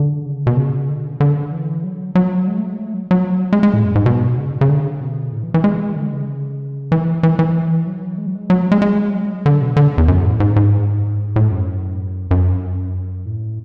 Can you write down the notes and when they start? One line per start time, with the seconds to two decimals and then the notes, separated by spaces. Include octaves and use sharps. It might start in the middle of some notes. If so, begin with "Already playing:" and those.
Already playing: D3
0.25 C#3
0.47 B2
0.57 C#3
0.89 D3
1.20 D3
1.52 E3
1.84 F#3
2.15 F#3
2.48 G#3
2.58 A3
2.68 G#3
2.79 A3
2.94 F#3
3.11 F#3
3.53 G#3
3.63 G#3
3.74 A2
3.85 F#2
3.95 G#2
4.06 B2
4.37 C#3
4.61 C#3
4.69 D3
5.01 B2
5.32 A2
5.43 E3
5.54 E3
5.64 G#3
5.96 D3
6.12 C#3
6.92 E3
7.23 E3
7.39 E3
7.87 F#3
8.18 G#3
8.27 F#3
8.35 G#3
8.50 F#3
8.72 G#3
8.82 G#3
9.14 F#3
9.46 D3
9.61 B2
9.77 D3
9.98 E2
10.08 F#2
10.24 A2
10.40 G#2
10.56 G#2
11.36 A2
11.51 F#2
12.31 F#2
13.26 A2